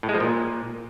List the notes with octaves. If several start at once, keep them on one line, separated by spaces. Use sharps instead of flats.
A2
G#3
F3
A#2